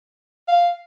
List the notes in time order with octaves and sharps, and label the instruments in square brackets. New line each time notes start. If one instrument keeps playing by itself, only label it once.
[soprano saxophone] F5